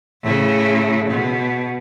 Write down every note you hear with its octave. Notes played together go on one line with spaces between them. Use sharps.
A2 C#3
B2